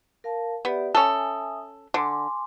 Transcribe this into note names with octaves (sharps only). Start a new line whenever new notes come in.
A#4 F5 A5
B3 G4 D5 E5
C#4 A4 E5 G#5 D#6
D3 G#5 C6 D6